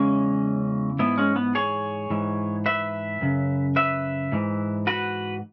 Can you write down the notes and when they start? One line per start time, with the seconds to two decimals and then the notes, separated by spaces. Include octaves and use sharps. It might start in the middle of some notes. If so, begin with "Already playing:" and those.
Already playing: E2 C#3 E3 G#3 C#4
0.99 G#2 E3 B3 E4
1.18 G#3 C#4
1.36 B3
1.55 G#4 C#5
2.10 G#2 E3
2.66 B4 E5
3.21 F#2 C#3
3.76 B4 E5
4.32 G#2 E3
4.87 F#4 B4